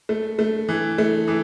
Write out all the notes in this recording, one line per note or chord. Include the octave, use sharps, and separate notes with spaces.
A3
A3
E3
A3
E3